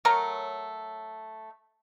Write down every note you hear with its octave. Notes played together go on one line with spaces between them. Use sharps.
F#3 A3 A#4 C#5